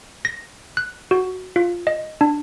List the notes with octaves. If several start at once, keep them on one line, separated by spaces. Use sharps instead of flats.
A#6
F#6
F#4
F4
D#5
D4